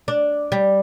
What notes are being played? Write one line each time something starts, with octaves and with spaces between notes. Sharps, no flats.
D4
G3